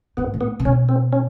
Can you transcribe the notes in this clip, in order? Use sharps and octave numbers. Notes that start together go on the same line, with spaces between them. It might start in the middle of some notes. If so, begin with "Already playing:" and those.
G#2 B3
A2
B3
C3
B2 C#4
C4
C#4